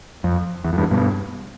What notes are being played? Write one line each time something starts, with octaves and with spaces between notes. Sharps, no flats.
F2
E2
F2
E2 G2
G2 B2